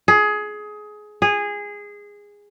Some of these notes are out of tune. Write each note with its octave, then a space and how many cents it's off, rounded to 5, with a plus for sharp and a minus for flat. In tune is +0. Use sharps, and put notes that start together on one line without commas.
G#4 +20
G#4 -15